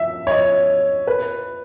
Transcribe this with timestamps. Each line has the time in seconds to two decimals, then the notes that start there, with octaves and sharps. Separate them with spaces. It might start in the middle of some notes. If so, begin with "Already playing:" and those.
Already playing: E5
0.27 C#5
0.31 D#5
1.07 B4